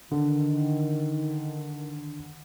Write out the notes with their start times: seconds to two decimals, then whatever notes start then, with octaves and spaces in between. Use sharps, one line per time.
0.11 D3 D#3